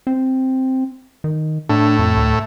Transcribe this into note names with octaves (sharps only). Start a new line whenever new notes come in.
C4
D#3
A2 D4
F2
D2